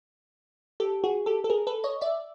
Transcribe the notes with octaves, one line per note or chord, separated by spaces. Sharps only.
G4 A4
F#4 G#4
G4 A4
A4
G#4 A#4
A4 B4
C#5 D#5
D5 E5